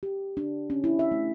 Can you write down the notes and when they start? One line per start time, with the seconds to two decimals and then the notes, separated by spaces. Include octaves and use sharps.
0.03 G4
0.37 D4
0.70 C#4
0.84 E4
0.99 E5
1.12 A3